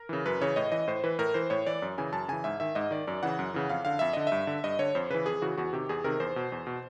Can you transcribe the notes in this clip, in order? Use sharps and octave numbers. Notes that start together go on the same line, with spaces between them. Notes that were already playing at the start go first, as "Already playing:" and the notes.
Already playing: A#4
C#3 E3
F#2 B4
C#3 E3 C#5
A2 D#5
E3 D#5
A2 C5
E3 B4
A2 A#4
E3 C5
A2 C#5
E3 D5
F#2
C#3 E3 G#5
F#2 A5
C#3 E3 G#5
G#2 E5
D#3 E5
G#2 D#5
D#3 D5
F#2 D5
C#3 E3 F#5
F#2
C#3 E3
F2 F5
D3 F5
F2 E5
D3 D#5
G2 E5
D3
G2 D#5
D3 C#5
F2 C5
C#3 E3 B4
F2 G#4
C#3 E3 F#4
E2 F#4
C3 D#3 G4
E2 G#4
C3 D#3 A#4
E2 C5
B2
E2
B2